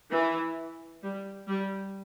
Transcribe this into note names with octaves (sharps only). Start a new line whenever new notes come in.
E3
G3
G3